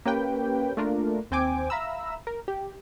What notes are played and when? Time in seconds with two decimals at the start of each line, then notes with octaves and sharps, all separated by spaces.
0.06 A#3 C#4 G4 B4 G5
0.77 A3 A#3 D4 F4 A#4
1.31 D#2 C4 G5 G#5 D6
1.70 E5 F5 A#5 B5 E6
2.27 A#4
2.48 G4